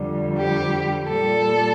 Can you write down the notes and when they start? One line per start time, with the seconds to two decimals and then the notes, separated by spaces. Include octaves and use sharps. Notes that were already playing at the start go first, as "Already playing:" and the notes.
Already playing: F2 D3 G3
0.38 G4
1.07 A#2 G3 A4